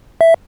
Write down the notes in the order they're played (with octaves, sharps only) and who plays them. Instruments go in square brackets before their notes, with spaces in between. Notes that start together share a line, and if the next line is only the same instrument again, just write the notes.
[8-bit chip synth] E5